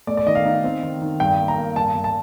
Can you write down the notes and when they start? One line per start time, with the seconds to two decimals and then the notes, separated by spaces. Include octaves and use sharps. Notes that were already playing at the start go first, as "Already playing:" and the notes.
0.07 A3 D5
0.17 D5
0.26 D#3 D#5
0.35 F5
0.45 D#4
0.64 C4
0.83 D#3
1.01 D#3
1.20 G2 G5
1.39 A#3
1.48 A#5
1.58 A#3
1.76 G2 A5
1.95 G2
2.04 A5